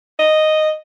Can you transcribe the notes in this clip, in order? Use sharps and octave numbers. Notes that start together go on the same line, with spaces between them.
D#5